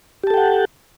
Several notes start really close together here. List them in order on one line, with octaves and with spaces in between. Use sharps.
G4 A5 A4 G5 F#5